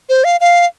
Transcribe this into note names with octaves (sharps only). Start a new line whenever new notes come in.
C5
F5
F5